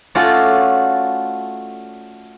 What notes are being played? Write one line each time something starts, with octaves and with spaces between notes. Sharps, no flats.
A3 C#4 F4 F#4 A4 D5